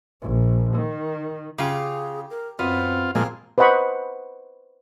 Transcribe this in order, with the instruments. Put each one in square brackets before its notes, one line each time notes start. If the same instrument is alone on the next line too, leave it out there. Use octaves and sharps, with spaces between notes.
[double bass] A#1
D#3
[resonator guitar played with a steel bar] C#3 F4 [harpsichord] G4 G5 D6 [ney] G#4
[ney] A#4
[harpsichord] F#2 [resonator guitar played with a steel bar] B3 [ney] C4 [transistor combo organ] F4
[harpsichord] A#1 C4 [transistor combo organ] A#2 F3 G#3 [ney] F5
[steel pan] B4 C5 D#5 F#5 B5 C#6